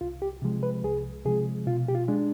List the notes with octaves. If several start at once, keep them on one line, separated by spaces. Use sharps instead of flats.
C2 F4
G4
C3 F3 G#3
B4
C2 G#4
C3 F3 G#3 G#4
B2 F4
G4
F4
G#3 D4